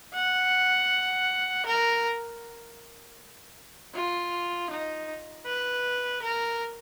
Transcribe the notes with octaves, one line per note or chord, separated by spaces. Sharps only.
F#5
A#4
F4
D#4
B4
A#4